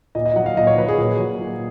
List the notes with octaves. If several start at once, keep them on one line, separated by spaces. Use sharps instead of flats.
A#2 D#5
D#5
F#3 F#5
F5
A#2 D#5
C#5
F#3 B4
G#4
A#2
F#3
A#2